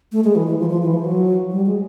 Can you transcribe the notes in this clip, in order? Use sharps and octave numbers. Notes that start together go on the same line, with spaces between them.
A3
G#3
E3
E3
F3
F3
E3
F3
F#3
G3
G#3